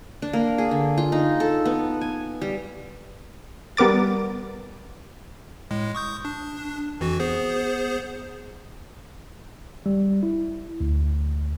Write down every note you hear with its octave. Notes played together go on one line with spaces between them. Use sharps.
D4
A#3
G#4
D3
F4
D#4
A4
B3
G#5
G3
G3 B3 A#4 D6 A6
A2 G#3
C#6 D#6 G6
D4
F2 E3 F#4
B3 G#4 C5
G3
E4
D2